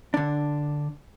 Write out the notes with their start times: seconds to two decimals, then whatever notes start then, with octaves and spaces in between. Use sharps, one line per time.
0.14 D3 D4